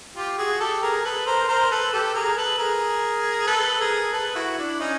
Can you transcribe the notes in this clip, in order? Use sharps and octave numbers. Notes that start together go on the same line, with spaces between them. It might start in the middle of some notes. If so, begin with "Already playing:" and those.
F4 G4
F#4 G#4
G4 A4
G#4 A#4
A4 B4
A#4 C5
A#4 C5
A4 B4
G4 A4
G#4 A#4
A4 B4
G#4 A#4
A4 B4
G#4 A#4
A4 B4
E4 F#4
D4 E4
C#4 D#4